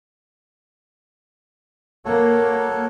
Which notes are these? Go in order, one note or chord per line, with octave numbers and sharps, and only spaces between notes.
A#3 F#4 A4 C#5